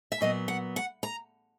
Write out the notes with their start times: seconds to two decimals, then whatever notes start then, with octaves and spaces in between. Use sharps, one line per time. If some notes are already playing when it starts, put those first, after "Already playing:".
0.12 E5
0.21 A#2 F#3 B3 D#5
0.48 F#5
0.76 F#5
1.03 A#5